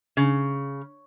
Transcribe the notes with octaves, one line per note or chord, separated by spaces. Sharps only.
C#3